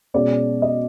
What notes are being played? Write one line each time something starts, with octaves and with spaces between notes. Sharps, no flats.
B2 G#3 C#4 D5
D#5